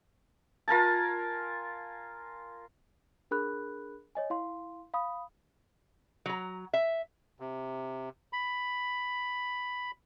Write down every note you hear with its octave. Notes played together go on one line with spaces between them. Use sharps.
F4 A#4 G#5 A5
D4 G#4 A#4 B5 F#6
C#5 D#5 G#5
E4 F5 C6
F5 B5 D#6
F#3 A#5
E5
C3
B5